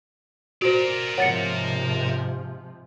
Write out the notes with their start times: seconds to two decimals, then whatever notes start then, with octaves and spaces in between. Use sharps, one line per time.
0.62 F#4 A#4 C5 D5
1.18 G#2 C3 F3 C#5 F#5 A6 C#7